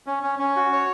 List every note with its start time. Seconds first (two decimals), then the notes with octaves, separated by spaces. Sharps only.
0.07 C#4
0.23 C#4
0.39 C#4
0.56 F#4
0.72 C#5